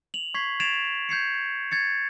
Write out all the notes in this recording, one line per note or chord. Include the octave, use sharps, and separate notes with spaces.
F7 F#7
C#6 G#6 B6 C7
G#6 A6 C7 D7 E7 F7
G6 G#6 C7 C#7
G#6 A6 C#7